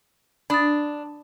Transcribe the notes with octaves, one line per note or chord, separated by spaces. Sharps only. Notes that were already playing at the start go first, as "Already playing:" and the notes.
D4 B5 D#6 A6